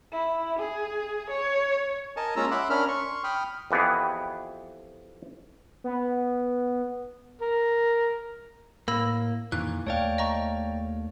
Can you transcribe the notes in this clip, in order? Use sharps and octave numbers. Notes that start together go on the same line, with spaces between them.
E4
G#4
C#5
A#4 D#5 G#5 A5
G#3 A#3 C#4 F4 A#5 E6
E5 F#5 B5 C6 D6
C#4 D4 A#4 B5 F6
C6 C#6
G5 B5 D#6 F6
F2 E3 B3 G4 G#4
B3
A#4
A2 A#3 B5 E6 A#6
F2 A#2 D#3 E3 F#6
D#2 A3 C#5 D5 F5 G5
D#5 A#5 C#6